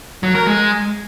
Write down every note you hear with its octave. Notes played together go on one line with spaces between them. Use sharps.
F#3
A#4
G#3